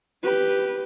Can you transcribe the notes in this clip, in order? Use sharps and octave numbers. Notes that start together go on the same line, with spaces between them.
G4 B4